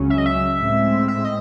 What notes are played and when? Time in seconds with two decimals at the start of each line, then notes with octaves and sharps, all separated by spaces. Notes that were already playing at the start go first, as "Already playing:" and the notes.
Already playing: C#2 C#3 F#3 C#4
0.10 E5
0.18 D#5
0.26 E5
0.59 A2 G#3 C4
1.08 E5
1.24 D#5